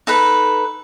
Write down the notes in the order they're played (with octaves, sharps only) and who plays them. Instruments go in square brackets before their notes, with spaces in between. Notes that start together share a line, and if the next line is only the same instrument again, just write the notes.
[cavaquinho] D#4 A4 B4